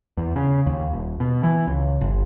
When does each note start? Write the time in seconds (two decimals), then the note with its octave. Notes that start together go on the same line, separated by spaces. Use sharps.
0.17 E2
0.36 C#3
0.66 D#2
0.93 D#1
1.20 B2
1.43 E3
1.67 C#2
2.01 G1